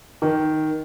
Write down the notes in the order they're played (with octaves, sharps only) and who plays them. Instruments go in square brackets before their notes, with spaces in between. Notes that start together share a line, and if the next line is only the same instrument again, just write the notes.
[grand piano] D#3